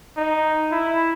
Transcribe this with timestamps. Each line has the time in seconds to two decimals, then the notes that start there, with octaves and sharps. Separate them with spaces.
0.17 D#4
0.72 E4